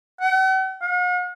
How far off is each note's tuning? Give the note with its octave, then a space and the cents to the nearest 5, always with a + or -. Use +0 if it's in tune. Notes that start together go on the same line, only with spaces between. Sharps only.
F#5 +45
F#5 -45